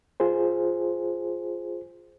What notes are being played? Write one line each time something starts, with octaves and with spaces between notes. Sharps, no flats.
F4 G#4 C5